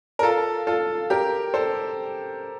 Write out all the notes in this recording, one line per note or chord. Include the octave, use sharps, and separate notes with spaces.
A#4
F4 A4
F4 A4
G4 A#4
A4 C5